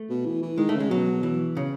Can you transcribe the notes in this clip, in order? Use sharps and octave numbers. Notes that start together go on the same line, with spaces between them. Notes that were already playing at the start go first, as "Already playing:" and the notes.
Already playing: A3
B2
E3
E3
D#3 G#3
A3
C#3
G#3
B2 F#3
E3
C#3